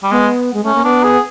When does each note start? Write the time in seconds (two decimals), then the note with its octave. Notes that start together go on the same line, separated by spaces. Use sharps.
0.03 G3
0.11 G#3 B3
0.54 G#3
0.64 A3 C#4
0.75 A#3
0.84 B3 D4
1.03 G#4